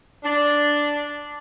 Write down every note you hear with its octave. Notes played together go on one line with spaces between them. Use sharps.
D4